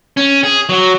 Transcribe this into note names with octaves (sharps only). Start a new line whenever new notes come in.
C#4
G#4
F#3